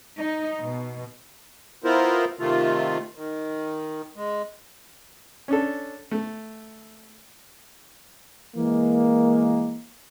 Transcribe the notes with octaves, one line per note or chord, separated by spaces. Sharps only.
D#4
B2
B3 E4 F4 A#4 C5
C3 D#3 A3 F4
D#3
G#3
C#4 D4 A4
A3
E3 G#3 A#3